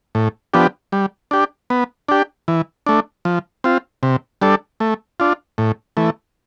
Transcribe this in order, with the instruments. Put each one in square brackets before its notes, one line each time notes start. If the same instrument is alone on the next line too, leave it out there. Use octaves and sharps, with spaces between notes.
[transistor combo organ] A2
F3 B3 D4 G4
G3
D4 G4
B3
D4 G4
E3
A3 D4
F3
C4 F4
C3
G3 D4 A4
A3
D4 F4
A2
E3 A3